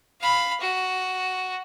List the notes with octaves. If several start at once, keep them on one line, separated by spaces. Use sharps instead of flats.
F5 B5
F#4